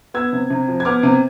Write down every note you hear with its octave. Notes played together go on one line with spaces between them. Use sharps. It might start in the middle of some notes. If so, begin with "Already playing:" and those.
B3 E6 G#6
C3
C3
F3
G#6
B3 D6 F6
C3